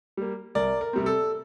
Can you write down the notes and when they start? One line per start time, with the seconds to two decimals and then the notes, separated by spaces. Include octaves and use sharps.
0.17 G3 A#3
0.55 C2 A#4 D5
0.81 A#4
0.93 C3 G3 C4
1.06 A4